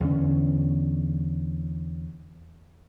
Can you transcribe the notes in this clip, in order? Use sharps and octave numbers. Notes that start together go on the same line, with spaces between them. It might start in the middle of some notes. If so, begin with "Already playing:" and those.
E2 D3 C#4